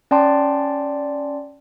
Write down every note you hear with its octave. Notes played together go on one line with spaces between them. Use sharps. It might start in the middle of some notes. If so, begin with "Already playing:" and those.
C#4 D5 G5 A5 C6